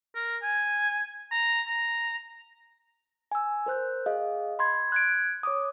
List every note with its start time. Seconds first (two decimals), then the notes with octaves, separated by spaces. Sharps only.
0.15 A#4
0.43 G#5
1.32 A#5
1.68 A#5
3.32 G#5 E6
3.66 A#4 C5 F#6 G6
4.06 G#4 D#5 F5
4.59 B5 C6 G#6
4.92 F#6 G#6 D7
5.43 C#5 D6 D#6